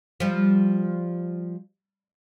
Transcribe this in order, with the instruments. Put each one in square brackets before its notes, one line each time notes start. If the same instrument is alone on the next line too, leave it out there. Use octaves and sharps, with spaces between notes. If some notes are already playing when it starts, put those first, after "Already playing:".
[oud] F3 G3